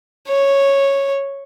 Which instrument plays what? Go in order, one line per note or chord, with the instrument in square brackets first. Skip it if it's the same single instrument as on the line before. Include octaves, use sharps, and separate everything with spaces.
[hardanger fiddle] C#5